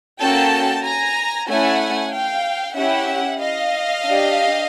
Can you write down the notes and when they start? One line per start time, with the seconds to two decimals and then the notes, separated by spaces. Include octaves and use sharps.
0.20 A#3 C#4 F#4 A4 G5 A5
0.84 G#5 A#5
1.48 A3 C#4 E4 F#5 G#5
2.12 F5 G5
2.76 C#4 E4 G4 E5 F#5
3.40 D#5 F5
4.04 D4 G4